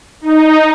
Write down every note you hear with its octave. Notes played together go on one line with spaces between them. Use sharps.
D#4